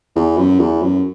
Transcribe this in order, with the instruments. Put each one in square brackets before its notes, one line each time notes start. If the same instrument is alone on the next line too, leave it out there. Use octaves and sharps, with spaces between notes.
[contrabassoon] E2
F#2
E2
F#2